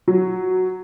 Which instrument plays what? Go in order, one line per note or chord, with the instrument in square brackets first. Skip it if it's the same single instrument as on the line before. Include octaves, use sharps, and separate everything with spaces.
[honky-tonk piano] F#3